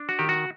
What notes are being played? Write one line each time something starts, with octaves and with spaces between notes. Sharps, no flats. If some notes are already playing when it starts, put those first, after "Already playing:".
Already playing: D4
F#4
D#3 G4
F#4